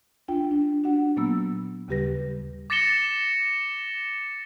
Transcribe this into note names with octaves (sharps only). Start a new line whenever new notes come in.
D4 F4 G5
D4
D4 F#4 F#5
A#2 F#3 A#3 B3 E6
D#2 C#3 G3 G4 B4 A#6
D6 A6 A#6 C#7 E7 G7